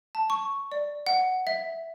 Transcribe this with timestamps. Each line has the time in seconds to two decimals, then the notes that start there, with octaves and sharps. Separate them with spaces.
0.15 A5
0.30 C#6
0.72 D5
1.07 F#5
1.47 E5